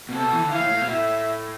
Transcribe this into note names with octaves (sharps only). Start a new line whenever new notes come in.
B2
C3 A4
B2
E3
D3
E3 F5
A2
A2
B2
A2 E5